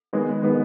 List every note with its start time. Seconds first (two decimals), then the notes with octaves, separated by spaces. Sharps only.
0.13 D#3 G#3 B3
0.43 D#3 G#3 B3